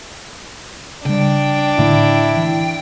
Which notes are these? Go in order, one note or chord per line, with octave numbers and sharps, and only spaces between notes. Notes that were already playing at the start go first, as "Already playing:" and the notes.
C#3 G3 D4 G5
A2 D3 A3 E4
E3